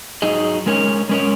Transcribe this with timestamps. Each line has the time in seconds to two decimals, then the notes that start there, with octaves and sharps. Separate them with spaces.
0.22 F#3 D#4 G#4 D#5
0.66 G#3 C#4 A#4 C#5
1.09 G#3 C#4 A#4 C#5